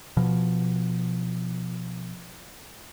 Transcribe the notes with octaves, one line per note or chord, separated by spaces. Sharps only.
B2 F3